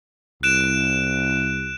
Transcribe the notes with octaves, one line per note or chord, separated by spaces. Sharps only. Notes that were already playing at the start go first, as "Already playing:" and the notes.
C2 F#6 D7 E7